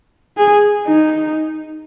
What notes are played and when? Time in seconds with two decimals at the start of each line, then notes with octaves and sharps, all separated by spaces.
0.38 G#4
0.87 D#4